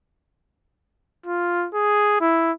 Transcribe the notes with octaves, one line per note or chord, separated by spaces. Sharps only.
F4
G#4
E4